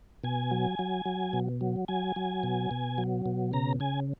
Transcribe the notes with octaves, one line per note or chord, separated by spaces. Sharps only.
B2 G#5
F#3
F#3
F#3
B2
F#3
F#3 G#5
F#3
B2
B2
F#3
B2
C#3 A#5
C#3 G#5